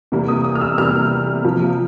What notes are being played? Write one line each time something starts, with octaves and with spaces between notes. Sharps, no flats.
C3 E3 G3 A#3
D#6
D#6
F6
E6
C3 E3 G3 A#3 F6
C3 F3 A#3